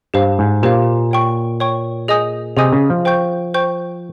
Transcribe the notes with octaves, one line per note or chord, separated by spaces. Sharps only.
G2 G4 C5 F5
G#2
A#2 G4 C5 F5
C#5 G5 C#6
C#5 G5 C#6
G#4 D#5 G#5 D#6 G6
C3 G#4 D#5 G#5 D#6 G6
C#3
F3
C5 G5 C#6 G6
C5 G5 C#6 G6